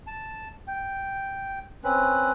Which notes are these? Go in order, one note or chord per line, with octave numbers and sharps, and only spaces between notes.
A5
G5
C4 C#4 B4